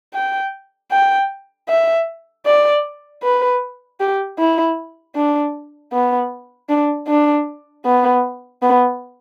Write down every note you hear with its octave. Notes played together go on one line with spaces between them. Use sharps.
G5
G5
E5
D5
B4
G4
E4
D4
B3
D4
D4
B3
B3